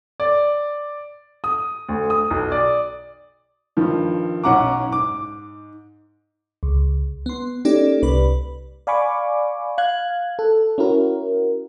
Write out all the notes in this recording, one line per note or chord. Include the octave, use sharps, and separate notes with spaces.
D5
D#6
D2
D#6
B1
D5
G2 D#3 F3
B1 C#4 F#5 A#5 D6
G#2 D6
C#2
B3 C6
A#3 C#4 D#4 G4 A4 D5
C2 B4 D5 B5
D5 F5 G#5 B5 C#6 D6
F5 F#6 G#6
A4
C#4 E4 F#4 A#4